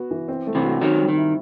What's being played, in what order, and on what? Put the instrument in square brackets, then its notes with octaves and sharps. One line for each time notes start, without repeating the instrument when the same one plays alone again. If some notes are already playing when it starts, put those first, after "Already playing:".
Already playing: [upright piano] B3 F#4
E3
C4
A3
[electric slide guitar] C3 E3
[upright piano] F#4
[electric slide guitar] D#3 F#3 [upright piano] C4
[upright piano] G3
[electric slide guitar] D#3
[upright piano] E4